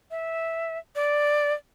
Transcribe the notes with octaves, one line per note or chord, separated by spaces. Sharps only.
E5
D5